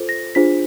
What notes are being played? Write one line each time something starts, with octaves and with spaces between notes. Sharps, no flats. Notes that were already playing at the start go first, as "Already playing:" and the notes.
Already playing: F4 A4 C5
A#6
D4 F4 G#4 C5 B6